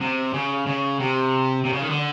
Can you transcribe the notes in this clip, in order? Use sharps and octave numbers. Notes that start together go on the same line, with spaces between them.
C3
C#3
C#3
C3
C3
C#3
D#3
D3